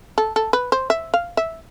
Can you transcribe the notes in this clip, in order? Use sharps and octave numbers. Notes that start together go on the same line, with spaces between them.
A4
A4
B4
C5
E5
F5
E5